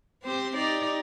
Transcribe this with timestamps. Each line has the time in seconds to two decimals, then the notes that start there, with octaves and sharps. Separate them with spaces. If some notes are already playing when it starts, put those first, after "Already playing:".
0.23 C4 G4 C5
0.56 D#4 G4 D5